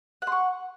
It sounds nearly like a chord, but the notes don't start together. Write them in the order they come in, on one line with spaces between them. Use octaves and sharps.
F#5 C6 C#6